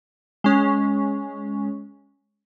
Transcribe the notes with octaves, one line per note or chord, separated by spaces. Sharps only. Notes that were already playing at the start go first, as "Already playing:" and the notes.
G#3 C#4